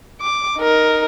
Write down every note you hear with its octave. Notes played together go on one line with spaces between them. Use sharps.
D6
D#4 A#4